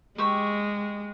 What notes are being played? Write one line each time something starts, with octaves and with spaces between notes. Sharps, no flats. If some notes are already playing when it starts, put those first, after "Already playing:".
G#3 G4 C#6 E6